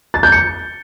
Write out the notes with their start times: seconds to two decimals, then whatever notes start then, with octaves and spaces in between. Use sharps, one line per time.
0.14 A6
0.23 G6
0.32 C#7